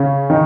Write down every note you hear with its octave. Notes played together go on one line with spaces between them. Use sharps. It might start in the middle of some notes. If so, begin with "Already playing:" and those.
Already playing: C#3 C#4
D#3 D#4